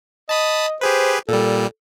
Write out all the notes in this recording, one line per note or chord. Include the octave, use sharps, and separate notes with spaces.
D#5 A5 B5 D#6
G4 G#4 B4 C5
A#2 G3 A4